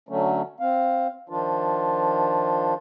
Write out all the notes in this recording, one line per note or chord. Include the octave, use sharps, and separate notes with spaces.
D3 F#3 A3 C#4
C4 F5
D#3 F3 D4 F4